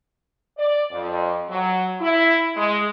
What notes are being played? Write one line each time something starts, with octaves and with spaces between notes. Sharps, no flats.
D5
F2
F#3
E4
G#3